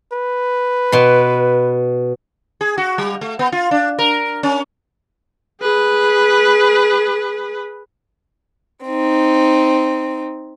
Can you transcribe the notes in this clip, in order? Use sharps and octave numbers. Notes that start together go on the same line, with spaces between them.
B4
B2 C6
G#4
F#4
G3
A3
B3
F4
D4
A#4
C#4
G#4 B4
C4 D#4